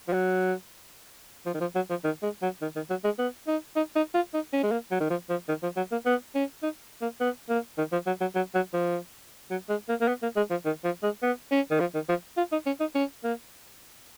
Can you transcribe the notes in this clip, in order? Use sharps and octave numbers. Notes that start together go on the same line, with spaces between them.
F3
F#3
F3
D#3
F3
F#3
F3
D#3
G#3
F#3
D#3
D#3
F#3
G#3
B3
D#4
D#4
D#4
F4
D#4
C#4
G#3
A#3
F#3
D#3
F3
F3
D#3
F3
F#3
A#3
B3
C#4
D#4
A#3
B3
A#3
D#3
F3
F#3
F#3
F#3
F#3
F3
F#3
G#3
A#3
A#3
B3
A#3
G#3
F3
D#3
F3
G#3
B3
C#4
D#3
F3
D#3
F3
F4
D#4
C#4
D#4
C#4
A#3